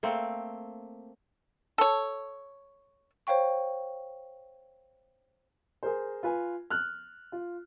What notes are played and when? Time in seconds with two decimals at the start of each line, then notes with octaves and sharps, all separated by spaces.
0.03 A3 A#3 C4
1.78 A4 C#5
3.27 C5 C#5 F5 G5 C#6
5.83 G#4 A#4 C5
6.23 F4 B4 G#5
6.70 F6 F#6
7.32 F4